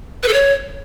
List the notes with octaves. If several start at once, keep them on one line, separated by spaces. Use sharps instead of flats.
B4
A4
C#5